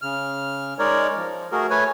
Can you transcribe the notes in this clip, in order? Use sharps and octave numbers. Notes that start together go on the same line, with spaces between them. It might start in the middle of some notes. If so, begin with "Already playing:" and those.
C#3 F6
G#3 D#4 A#4 C#5 D5
F3
A3 F#4 G#4 A#4
A3 B4 C#5 G#5